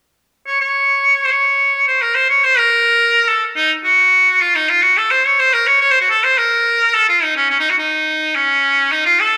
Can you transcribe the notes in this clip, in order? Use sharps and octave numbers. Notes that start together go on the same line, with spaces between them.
C#5
C#5
C5
C#5
C5
A#4
C5
C#5
C5
A#4
A4
D#4
F#4
F4
D#4
F4
F#4
A4
C5
C#5
C5
A#4
C#5
C#5
C5
F#4
A4
C5
A#4
A4
F4
D#4
C#4
C#4
D#4
F#4
D#4
C#4
D#4
F4
A4